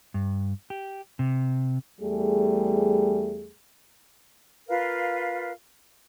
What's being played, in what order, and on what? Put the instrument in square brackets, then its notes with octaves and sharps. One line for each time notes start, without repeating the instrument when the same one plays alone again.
[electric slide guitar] G2
G4
C3
[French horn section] E2 G3 A3 G#4
[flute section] F4 A#4 B4 F5